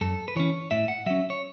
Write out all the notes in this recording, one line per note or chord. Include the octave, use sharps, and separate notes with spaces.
F#2 A4
B4
E3 C#4 C#5
A2 E5
F#5
F#3 C#4 E5
C#5